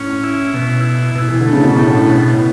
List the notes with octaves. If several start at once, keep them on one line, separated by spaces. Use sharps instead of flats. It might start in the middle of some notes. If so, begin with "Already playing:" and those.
Already playing: A2 C#4
E4
B2
E4
B2
E3
D3
A3
C#3
B2
A2 A3
B2